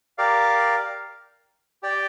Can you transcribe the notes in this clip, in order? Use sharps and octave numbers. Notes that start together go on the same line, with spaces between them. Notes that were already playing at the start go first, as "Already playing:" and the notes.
G4 A#4 D5 F5
G4 D5 G5